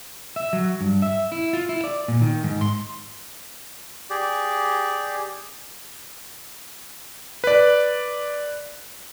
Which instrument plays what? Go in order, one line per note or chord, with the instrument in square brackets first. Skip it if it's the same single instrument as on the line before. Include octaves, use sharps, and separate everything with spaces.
[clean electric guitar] E5
F#3
G2
E5
E4
F4
E4
D5
A#2
D#3
G#2
C6
[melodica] G4 G#4 D5
[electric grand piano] B4 D5